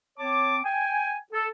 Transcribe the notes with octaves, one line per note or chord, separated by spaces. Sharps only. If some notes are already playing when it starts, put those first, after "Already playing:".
C4 C#5 A5 D6
G5 G#5
A4